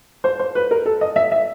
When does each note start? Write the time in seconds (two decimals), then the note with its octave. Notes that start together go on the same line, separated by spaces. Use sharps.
0.24 C5
0.39 C5
0.55 B4
0.71 A#4
0.86 A4
1.01 D#5
1.16 E5
1.32 E5